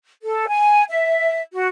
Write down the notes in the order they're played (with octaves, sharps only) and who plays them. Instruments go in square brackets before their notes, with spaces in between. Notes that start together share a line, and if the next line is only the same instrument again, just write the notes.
[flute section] A4
G#5
E5
F#4